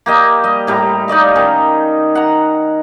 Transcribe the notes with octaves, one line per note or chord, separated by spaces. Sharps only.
A#3 G4 D#5
G3 D#5
A2 G3 A#5
D#4 D5 D#5 F5
D#3 C#4
F#5 A#5